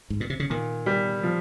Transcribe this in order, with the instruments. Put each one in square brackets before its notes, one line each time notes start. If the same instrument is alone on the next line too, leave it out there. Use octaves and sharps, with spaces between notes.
[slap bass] G#2
A#2
C3
C#3
[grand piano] A#2 [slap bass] D#3
[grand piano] G3
F3